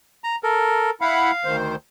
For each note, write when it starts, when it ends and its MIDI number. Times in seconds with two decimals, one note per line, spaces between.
0.24 0.36 82
0.43 0.90 69
0.43 0.90 70
1.01 1.31 64
1.01 1.56 77
1.01 1.31 78
1.01 1.31 83
1.45 1.75 38
1.45 1.75 51
1.45 1.75 72